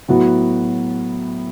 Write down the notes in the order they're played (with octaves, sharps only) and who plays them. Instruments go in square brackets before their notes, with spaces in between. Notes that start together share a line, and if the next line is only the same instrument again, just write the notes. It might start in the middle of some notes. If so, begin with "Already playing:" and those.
[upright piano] A2 F#3 B3 F#4